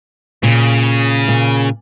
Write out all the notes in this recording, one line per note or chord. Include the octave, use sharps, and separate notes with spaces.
A#2 C#3
A#2